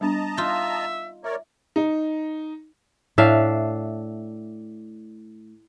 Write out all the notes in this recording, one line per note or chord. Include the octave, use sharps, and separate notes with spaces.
G3 B3 D4 D#5 A5 A#5
D#4 F4 E5
A#4 C#5 D5 E5
D#4
A2 D4 E5 F5